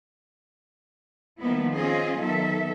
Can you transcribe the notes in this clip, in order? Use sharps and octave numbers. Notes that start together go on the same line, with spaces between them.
D#3 F3 G3 A#3 B3 E4
C4 C#4 F4 G#4 D#5
D#3 F#3 B3 A4 E5